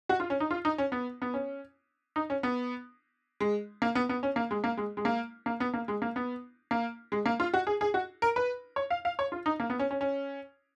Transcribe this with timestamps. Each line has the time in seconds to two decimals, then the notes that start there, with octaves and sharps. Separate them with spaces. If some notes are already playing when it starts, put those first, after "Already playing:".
0.09 F#4
0.20 F4
0.30 C#4
0.40 D#4
0.51 F4
0.65 D#4
0.78 C#4
0.92 B3
1.22 B3
1.34 C#4
2.16 D#4
2.30 C#4
2.43 B3
3.41 G#3
3.82 A#3
3.95 B3
4.09 B3
4.23 C#4
4.36 A#3
4.51 G#3
4.64 A#3
4.77 G#3
4.97 G#3
5.05 A#3
5.46 A#3
5.60 B3
5.74 A#3
5.88 G#3
6.02 A#3
6.16 B3
6.71 A#3
7.12 G#3
7.26 A#3
7.40 F4
7.54 F#4
7.67 G#4
7.81 G#4
7.94 F#4
8.22 A#4
8.36 B4
8.76 C#5
8.91 F5
9.05 F5
9.19 C#5
9.32 F4
9.46 D#4
9.60 A#3
9.70 B3
9.79 C#4
9.91 C#4
10.01 C#4